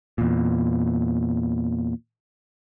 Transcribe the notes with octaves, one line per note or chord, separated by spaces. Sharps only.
E2 A#2